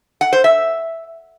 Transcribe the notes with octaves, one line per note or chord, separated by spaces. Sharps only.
F#5
C5
E5